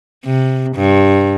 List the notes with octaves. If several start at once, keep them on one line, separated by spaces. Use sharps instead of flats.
C3
G2